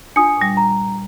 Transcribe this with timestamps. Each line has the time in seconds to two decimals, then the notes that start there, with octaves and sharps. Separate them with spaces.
0.16 D4 F4 D#6 C#7
0.37 A#2 G3
0.57 A#5